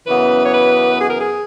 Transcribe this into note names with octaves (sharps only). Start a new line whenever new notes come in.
F#2 C#3 E3 B3 B4
C#5
B4
G#4
A#4
G#4